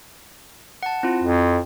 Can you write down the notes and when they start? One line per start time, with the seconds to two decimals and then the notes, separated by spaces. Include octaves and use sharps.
0.83 F#5 A5
1.03 C4 E4 F4
1.23 F2